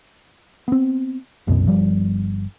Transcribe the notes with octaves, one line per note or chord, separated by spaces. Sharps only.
B3 C4
F#1 C2 F#2 B2
G1 F3 G3